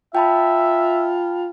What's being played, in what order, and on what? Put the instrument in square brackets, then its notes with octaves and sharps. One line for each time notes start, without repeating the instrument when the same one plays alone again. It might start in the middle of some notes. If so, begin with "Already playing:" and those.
[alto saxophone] F4 [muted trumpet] E5 [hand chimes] G5 A5 B5